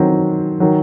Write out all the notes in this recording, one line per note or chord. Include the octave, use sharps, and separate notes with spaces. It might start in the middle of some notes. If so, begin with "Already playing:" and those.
Already playing: D#3 F#3 C4
D#3 F#3